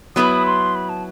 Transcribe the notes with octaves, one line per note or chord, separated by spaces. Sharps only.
F#3 B3 E4 B4 D#6
C6
B5
A5